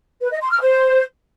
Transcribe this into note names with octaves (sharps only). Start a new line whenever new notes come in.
B4
D#5
C6
F6
C5